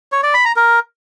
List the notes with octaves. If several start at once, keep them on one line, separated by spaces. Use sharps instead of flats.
C#5
D5
B5
A#5
A#4